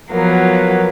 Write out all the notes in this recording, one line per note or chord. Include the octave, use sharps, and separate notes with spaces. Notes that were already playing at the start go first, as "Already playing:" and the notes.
F3 F#3 A#3 B3